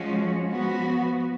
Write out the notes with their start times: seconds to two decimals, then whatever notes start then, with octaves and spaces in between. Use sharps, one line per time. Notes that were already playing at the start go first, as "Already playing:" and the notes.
Already playing: F3 G#3 C#4 F#4
0.48 F3 B3 F#4